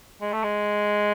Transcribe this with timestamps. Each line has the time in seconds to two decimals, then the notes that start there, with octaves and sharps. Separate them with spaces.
0.21 G#3
0.33 A3
0.43 G#3